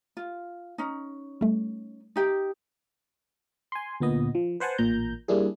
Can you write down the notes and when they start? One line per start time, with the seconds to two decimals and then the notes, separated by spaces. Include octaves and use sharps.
0.17 F4
0.78 C#4 D#4
1.41 G3 A3
2.16 D#4 G4 G5
3.72 G#5 C6
4.00 D2 A#2 B3 D#5
4.35 F3
4.60 B4 C5 F#5 G#5 A5
4.78 A1 A#2 A#5 G6
5.28 G3 A#3 D4 E4 G#4